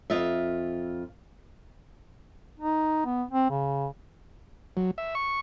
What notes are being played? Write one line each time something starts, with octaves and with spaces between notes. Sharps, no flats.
F2 F4 D#5 E5
D#4
B3
C4
C#3
F#3
E5
C#6